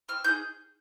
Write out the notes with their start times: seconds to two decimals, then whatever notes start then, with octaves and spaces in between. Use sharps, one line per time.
0.09 C4 F6
0.24 D#4 G#4 G6